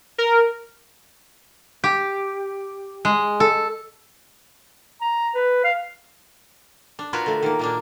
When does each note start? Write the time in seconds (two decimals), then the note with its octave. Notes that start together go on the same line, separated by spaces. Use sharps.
0.18 A#4
1.84 G4
3.05 G#3
3.40 A4
5.01 A#5
5.35 B4
5.64 F5
6.99 D4
7.13 F4 F#4 A#4 B4 C#5
7.26 D3 A3
7.43 D#3 A#3
7.59 A#2 A#3 D4